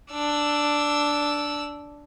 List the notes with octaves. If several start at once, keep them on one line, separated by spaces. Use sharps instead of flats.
D4 E6